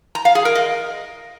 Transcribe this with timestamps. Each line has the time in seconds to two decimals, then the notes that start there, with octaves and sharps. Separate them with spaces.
0.15 A#5
0.25 F5
0.35 G#4
0.45 A#4
0.55 D#5